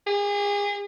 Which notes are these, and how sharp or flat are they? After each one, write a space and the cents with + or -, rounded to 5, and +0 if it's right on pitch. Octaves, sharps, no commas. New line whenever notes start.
G#4 -35